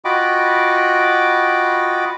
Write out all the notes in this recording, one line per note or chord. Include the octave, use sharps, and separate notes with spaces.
F4 F#4 D#5 G5 B5 D6